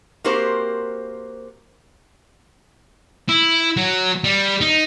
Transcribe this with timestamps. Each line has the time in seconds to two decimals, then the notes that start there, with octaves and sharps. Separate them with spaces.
0.24 A#3 C4 F#4 G4 A#4 C5
3.29 E4
3.77 F#3
4.24 G3
4.61 D#4